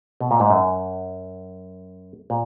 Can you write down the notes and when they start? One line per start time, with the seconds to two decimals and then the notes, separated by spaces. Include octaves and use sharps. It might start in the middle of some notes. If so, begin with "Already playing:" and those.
0.21 B2
0.31 A#2
0.40 G#2
0.50 F#2
2.30 A#2